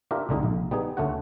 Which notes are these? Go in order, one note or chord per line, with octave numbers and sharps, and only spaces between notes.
D4 F4 G4 A#4 E5
C2 D3 G#3 D#4
A#1
G3 B3 D#4 G#4
D2 A3 C#4 F#4 F#5